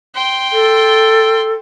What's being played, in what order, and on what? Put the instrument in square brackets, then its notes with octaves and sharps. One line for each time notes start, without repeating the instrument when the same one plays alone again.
[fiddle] G5 C6
[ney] A4